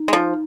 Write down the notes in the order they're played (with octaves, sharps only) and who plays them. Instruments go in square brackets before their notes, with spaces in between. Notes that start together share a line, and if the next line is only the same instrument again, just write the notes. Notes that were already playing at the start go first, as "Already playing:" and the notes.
Already playing: [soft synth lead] D#4
[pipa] G#3
F3